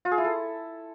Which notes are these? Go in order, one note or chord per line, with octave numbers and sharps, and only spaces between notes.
F4
G#4
E4
A4